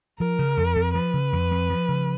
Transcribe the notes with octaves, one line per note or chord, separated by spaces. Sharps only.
F3 A#4
C#3
F2
F2
F3 B4
C#3
F2
F2
F3
C#3